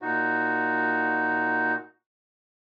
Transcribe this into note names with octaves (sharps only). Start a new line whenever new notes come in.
A#2 D#4 F#4